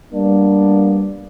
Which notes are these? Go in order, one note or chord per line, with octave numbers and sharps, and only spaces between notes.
G3 A#3 B3 D4